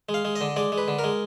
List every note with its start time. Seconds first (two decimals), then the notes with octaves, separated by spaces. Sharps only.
0.09 G#3
0.14 F5
0.25 G#3
0.36 D#5
0.41 D3
0.56 G#3 D5
0.72 G#3
0.78 B4
0.88 D3
0.99 A#4
1.04 G#3